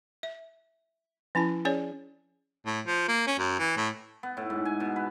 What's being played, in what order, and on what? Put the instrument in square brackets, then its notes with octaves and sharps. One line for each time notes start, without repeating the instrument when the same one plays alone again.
[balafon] E5
F3 C#4 E4 A5
C#4 G#4 C#5 D5
[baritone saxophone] A2
F3
A#3
C#4
F#2
E3
A2
[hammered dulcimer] B3
A2
G#2
G#5
B2
B4